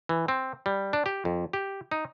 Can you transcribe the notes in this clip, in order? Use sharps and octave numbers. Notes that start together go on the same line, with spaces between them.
E3
C4
G3
D4
G4
F2
G4
D#4